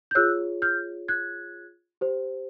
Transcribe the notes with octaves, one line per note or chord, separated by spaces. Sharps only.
G6
F4 G#4 C#5 E6 F#6
F6 G6
F#6 G#6
G4 C5